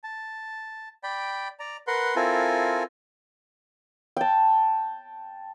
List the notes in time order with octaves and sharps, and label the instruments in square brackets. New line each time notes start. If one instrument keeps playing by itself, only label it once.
[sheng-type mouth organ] A5
D5 G5 B5
D5 A#5
A#4 B4 F#5 C6
C4 E4 F4 A4 A#4 G#5
[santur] G5 A5